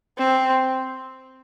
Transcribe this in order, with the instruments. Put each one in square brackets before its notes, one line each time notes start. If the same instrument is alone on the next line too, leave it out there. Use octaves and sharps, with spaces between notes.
[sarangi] C4